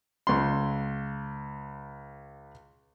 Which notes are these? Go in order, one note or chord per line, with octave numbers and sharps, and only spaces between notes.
C#2 C6